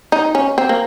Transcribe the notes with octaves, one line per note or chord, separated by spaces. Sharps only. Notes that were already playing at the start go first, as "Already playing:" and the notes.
D#4
C#4
C4
A#3